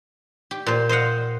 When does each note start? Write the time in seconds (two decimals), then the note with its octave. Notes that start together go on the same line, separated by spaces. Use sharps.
0.51 G4
0.66 A#2 C5
0.89 C5 D#5 F5 F#5